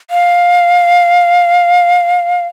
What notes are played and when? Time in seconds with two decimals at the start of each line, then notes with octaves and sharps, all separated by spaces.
0.10 F5